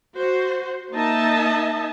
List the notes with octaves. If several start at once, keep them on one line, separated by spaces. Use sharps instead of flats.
F#4 C5
A#3 D#4 D#5 E5 A5